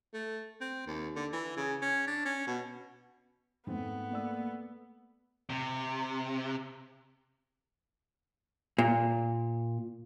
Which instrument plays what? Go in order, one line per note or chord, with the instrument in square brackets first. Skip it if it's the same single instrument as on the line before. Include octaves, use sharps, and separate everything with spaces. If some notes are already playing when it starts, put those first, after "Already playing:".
[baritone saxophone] A3
C4
D#2
D3
E3
C#3
C#4
D4
C#4
B2
[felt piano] G#2 A3 C4 [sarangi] B3
[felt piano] A3 D5 E6 [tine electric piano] A#3
[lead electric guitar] C3
[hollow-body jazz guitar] A#2